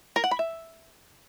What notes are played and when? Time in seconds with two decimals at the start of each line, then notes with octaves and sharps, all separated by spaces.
0.16 A#4
0.24 F#5
0.31 B5
0.39 E5